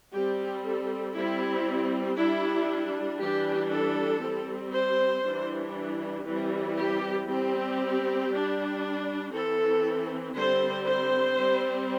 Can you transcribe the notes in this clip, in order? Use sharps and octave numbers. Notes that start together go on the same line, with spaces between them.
G3 C4 G4
A4
G3 C4 E4
G3 D4 E4
E3 G3 D4 G4
A4
G3 C4
C5
E3 G3 D4
E3 G3 C4
G4
G3 C4 G4
G3 D4
E3 C4 A4
D3 G3 C4 C5
C5
G3 C4